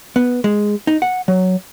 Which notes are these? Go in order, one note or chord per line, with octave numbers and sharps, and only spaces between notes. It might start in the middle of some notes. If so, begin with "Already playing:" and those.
B3
G#3
D#4
F#5
F#3